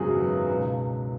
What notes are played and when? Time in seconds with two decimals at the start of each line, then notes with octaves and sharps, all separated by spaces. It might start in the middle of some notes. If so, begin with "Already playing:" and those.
Already playing: G#1 F#2 C#3 F#3 B3 F#4 G#4
0.49 C#2 B2 B3 B4